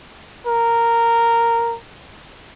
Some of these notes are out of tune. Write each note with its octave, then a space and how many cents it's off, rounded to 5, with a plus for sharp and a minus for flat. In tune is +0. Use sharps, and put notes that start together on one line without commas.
A#4 -5